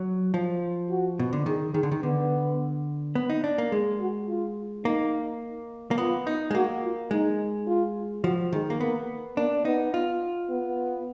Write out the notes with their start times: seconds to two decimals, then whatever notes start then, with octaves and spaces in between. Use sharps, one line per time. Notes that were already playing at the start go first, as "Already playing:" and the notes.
Already playing: F#3
0.34 F3
0.90 F#4
1.19 B2
1.33 D3
1.46 D#3 G#4
1.74 D#3 G#4
1.83 D3
1.91 D#3
2.03 D3 B3
3.15 B3
3.30 D#4
3.44 D4
3.58 A#3
3.72 G#3 G#4
4.00 F#4
4.28 F4
4.85 A#3 D#4
5.91 A#3
5.98 B3 F4
6.27 D#4
6.51 G#3
6.55 A#3 F#4
6.83 F4
7.11 G#3 D#4
7.67 F4
8.24 F3 F#4
8.52 D#3 G#3
8.70 A#3
8.80 A#3 B3
9.36 A#3 D4
9.65 B3 D#4
9.94 F4
10.50 B3